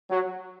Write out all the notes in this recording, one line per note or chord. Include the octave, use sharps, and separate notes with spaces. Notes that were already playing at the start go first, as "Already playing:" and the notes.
F#3